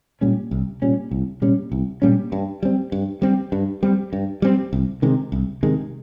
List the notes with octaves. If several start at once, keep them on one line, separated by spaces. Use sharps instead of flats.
A#2 G3 C#4
C2
A#2 G3 C#4
C2
A#2 G3 C#4
C2
A#2 G3 C#4
G2
G3 C4
G2
G3 C4
G2
G3 C4
G2
G3 C4
C2
C3 D#3 G#3
C2
C3 D#3 G#3